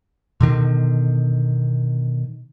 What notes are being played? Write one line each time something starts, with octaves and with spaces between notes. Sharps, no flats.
B2 D3 D#3